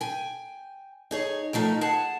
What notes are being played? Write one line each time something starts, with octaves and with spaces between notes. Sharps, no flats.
G5 G#5
D#4 G#4 C#5
D#3 F3 A3 D#4
G#4 F#5 A5